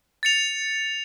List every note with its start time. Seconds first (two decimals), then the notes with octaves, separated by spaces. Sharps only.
0.23 A6 C#7 F7